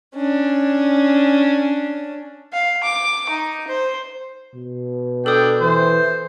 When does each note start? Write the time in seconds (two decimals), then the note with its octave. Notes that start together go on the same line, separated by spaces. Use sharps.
0.15 C#4 D4
2.53 F5
2.83 D6
3.30 D#4
3.68 C5
4.55 B2
5.26 D4 A4 G5 D#6
5.61 E3 C5